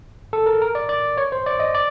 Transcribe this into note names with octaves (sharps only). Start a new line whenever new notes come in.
A4
A#4
A#4
D5
D5
C#5
C5
D5
D#5
D5